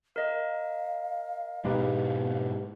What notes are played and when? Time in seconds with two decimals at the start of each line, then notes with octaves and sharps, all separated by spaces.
0.16 A#4 D#5 F5
1.65 G#2 B2 G#3 D#4 G4 B4